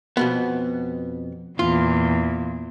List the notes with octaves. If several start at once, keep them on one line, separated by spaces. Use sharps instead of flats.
F2 B2 B3
E2 A#2 F4